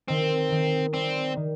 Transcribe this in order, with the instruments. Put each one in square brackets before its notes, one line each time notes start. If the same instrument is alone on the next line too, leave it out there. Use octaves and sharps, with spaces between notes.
[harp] D#3 [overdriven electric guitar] C4
[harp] D#3
[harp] G3 [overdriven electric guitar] C4
[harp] D#3